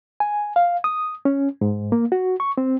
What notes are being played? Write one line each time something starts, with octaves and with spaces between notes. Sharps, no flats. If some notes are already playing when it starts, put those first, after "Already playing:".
G#5
F5
D#6
C#4
G#2
A#3
F#4
C#6
C4